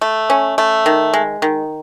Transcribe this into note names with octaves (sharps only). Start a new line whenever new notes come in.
A3
C#4
A3
D#3
G#3
D#3